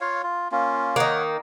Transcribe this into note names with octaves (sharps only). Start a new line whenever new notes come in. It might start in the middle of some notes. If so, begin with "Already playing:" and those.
F4 C#5 F5
F4
A#3 C#4 F4
D#3 A#3 C#5 F#5